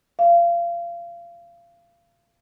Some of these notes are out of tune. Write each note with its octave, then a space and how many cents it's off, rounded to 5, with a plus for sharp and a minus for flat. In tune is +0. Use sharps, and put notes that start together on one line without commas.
F5 -30